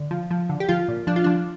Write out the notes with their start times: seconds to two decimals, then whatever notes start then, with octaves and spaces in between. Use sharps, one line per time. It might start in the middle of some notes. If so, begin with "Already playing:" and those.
Already playing: D3
0.11 F3
0.31 F3
0.49 D3
0.60 G4
0.69 F3 F4
0.88 A#2
1.07 F3 D4
1.16 F4
1.24 F3 D4